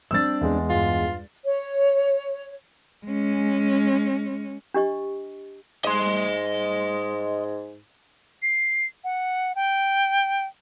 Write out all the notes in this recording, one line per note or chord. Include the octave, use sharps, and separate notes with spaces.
G3 C4 D4 E6 A6
E2 G#3
G2 F4
C#5
G#3 C#4
D4 G4 D#5 C#6
G#2 D#5 C6
C7
F#5
G5